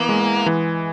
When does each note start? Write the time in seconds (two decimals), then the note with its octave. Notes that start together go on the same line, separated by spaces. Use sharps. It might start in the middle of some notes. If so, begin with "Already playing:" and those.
Already playing: E3 A#3 B3
0.09 G#3
0.46 E3